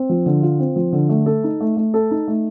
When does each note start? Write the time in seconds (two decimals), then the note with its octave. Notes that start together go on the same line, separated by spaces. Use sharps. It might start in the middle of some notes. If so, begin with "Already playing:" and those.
Already playing: C4
0.09 F3
0.26 D3
0.43 F4
0.59 C4
0.76 F3
0.93 D3
1.09 A3
1.26 A4
1.44 D#4
1.61 A3
1.77 A3
1.94 A4
2.11 D#4
2.28 A3